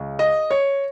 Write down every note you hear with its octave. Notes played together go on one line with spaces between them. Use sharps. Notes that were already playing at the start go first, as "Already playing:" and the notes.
Already playing: C#2
D#5
C#5